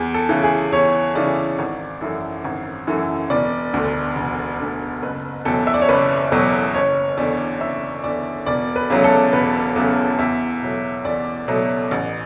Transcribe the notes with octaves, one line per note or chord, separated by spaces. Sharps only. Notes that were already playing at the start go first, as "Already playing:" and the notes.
Already playing: E2 G#4
A4
C#3 E3
G#4
E2 C#5
C#3 E3 D5
G#1
F#2 E3 A3
G#1
F#2 E3 A3
E1 D5
D2 D3
E1
D2 D3
F#1 B4
E2 B2 F#3 A3 A4
E5
D5
C#5
F#1 B4
E2 B2 F#3 A3
F#1 C#5
E2 D3 D5
F#1 E5
E2 D3 D5
E1 D5
B4
E2 C#3 F#3 A3
A4
E1 B4
E2 C#3 F#3 A3
E2 E5
B2 F#3 A3
E2 D5
B2 F#3 A3
A1